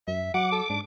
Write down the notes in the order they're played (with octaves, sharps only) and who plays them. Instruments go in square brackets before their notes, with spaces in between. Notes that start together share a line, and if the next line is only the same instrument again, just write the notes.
[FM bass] F#2 [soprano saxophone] E5
[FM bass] F#3 [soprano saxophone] F#5 [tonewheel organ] D6
[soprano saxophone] A4
[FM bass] G#2 [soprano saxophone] D4